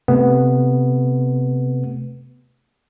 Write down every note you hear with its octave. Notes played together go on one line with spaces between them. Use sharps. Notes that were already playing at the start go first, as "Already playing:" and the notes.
C3 A3 B3